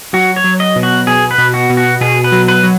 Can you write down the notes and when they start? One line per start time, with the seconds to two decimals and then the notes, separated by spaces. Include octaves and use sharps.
0.13 F#3 F#4
0.36 C#5
0.44 F#3
0.60 D#5
0.76 B2
0.83 F#4
1.07 B2 G#4
1.31 B4
1.38 B2
1.54 F#4
1.70 B2
1.77 F#4
2.01 B2 G#4
2.24 B4
2.32 F#3
2.48 B4
2.63 F#3